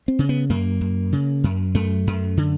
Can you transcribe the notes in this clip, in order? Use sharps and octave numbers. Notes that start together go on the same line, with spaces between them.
C4
C#3
B3
F#2 A#3
F#2
C#3
F#2
F#2 A3
F#2
D3